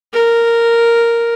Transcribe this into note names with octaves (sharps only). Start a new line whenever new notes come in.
A#4